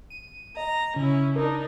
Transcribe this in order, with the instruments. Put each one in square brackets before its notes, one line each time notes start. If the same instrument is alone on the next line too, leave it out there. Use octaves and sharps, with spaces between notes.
[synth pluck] D#7
[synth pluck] D#5 [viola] A#5
[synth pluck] C#3 [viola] C#4 E4
[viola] D4 D#4 [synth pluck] A#4